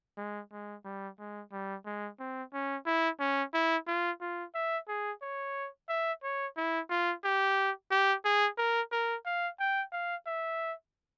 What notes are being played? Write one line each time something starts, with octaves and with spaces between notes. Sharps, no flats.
G#3
G#3
G3
G#3
G3
G#3
C4
C#4
E4
C#4
E4
F4
F4
E5
G#4
C#5
E5
C#5
E4
F4
G4
G4
G#4
A#4
A#4
F5
G5
F5
E5